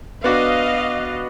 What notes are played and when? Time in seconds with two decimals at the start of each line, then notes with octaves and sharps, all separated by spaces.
0.24 B3 D4 F#4 D#5 F5